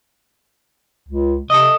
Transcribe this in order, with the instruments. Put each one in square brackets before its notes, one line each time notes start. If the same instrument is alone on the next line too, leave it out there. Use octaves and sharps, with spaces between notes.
[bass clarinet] C#2
[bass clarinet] C3 [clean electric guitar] A4 D#5